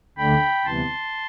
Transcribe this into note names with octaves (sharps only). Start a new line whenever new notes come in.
D2 D3 A3 D4 G5 B5
D2 C3 E3 G3 B3 A5 C6